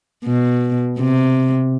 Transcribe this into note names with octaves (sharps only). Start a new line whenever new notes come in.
B2
C3